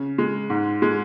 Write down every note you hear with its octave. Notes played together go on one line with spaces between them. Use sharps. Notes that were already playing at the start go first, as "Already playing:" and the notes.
Already playing: C#3
G#3
G#2
G#3